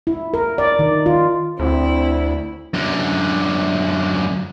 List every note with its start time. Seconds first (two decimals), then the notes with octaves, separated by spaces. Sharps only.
0.07 E4
0.34 A#4
0.58 D5
0.79 D#3
1.06 F4
1.59 D2 C4 E4
2.74 F#2 D3